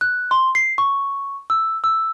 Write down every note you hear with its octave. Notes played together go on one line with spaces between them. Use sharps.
F#6
C6
C7
C#6
E6
E6